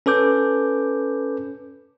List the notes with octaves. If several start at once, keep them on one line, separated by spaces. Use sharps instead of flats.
C#4 A4 B4 D6 G6